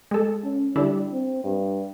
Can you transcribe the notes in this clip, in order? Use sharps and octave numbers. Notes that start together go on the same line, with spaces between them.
G#3 A4
C#4
D3 G3 D4 E4
C4
G2